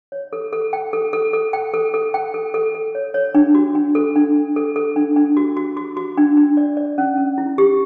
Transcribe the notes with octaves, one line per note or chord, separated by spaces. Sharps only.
C#5
A4
A4
G5
A4
A4
A4
G5
A4
A4
G5
A4
A4
A4
C#5
C#5
D4
F#4
D4
A4
D4
D4
A4
A4
D4
D4
F#4
F#4
F#4
F#4
D4
D4
D5
D5
C#4
C#4
E4
G4